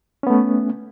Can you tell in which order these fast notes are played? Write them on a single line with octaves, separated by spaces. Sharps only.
C#4 B3 A3